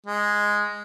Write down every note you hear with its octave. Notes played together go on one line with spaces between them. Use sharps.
G#3